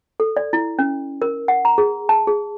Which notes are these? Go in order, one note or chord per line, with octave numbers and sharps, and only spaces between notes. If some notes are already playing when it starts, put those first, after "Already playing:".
A4
D5
E4
C#4
A#4
F#5
A#5
G#4
A5
G#4